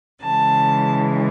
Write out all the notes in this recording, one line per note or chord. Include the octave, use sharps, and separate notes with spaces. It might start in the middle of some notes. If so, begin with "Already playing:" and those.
C#3 E3 G#3 A5